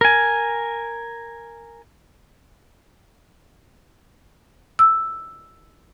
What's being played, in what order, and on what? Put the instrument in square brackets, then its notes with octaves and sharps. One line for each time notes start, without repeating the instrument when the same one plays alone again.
[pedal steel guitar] A#4 G#5
[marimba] E6